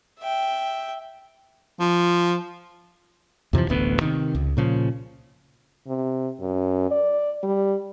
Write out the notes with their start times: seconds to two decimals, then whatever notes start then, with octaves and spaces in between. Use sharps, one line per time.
0.20 E5 G5
1.80 F3
3.53 F2 C3 E3 F3
3.69 D1 A1 D2 B3
4.01 C3 D#3
4.35 C#2
4.57 A#2 C#3 F3
5.87 C3
6.41 F#2
6.91 D5
7.43 G3